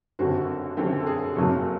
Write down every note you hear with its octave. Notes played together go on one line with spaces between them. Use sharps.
F#1 F#2 D3 G3 C4 F#4
F#1 F#2 D3 G3 C4 G4
A4
G#4
F#1 F2 C#3 F#3 A#3 A4